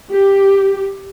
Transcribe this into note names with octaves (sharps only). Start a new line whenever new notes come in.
G4